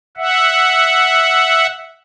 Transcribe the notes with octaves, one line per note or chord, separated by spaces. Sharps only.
E5 F#5